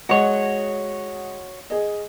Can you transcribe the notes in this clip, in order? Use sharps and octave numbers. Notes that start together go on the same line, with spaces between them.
G#3 F#4 C#5 D#5 F#5
G#4 D#5